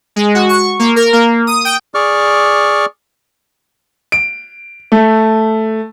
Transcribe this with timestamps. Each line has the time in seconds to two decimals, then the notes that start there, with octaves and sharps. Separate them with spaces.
0.16 G#3
0.35 F#4
0.49 C#6
0.79 A#3
0.96 A#4
1.13 A#3
1.47 D#6
1.65 G5
1.94 G#4 D5 C#6 D6 F6
4.12 D7
4.92 A3